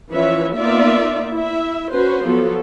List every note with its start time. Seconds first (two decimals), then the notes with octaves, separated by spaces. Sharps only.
0.11 E3 F3 C#4 B4 C#5 E5
0.56 A#3 B3 D#4 F4 D5 E5
1.31 E4 E5
1.92 C#4 F#4 B4 C5
2.23 F3 F#3 B3 A4